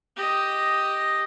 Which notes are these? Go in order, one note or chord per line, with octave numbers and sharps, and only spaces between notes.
G4 D#5